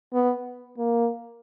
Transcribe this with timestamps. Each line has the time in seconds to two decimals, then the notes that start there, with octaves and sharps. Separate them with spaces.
0.13 B3
0.78 A#3